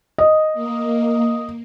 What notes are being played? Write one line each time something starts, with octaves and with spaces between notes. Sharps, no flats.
D#5
A#3